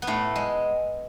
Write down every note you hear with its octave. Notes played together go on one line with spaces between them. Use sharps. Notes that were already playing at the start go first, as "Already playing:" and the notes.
B3
A2 A3
G#3